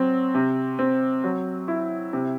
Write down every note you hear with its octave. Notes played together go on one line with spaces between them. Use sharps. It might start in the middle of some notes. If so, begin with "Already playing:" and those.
Already playing: F#3 C4
C3
C4
F#3
E4
C3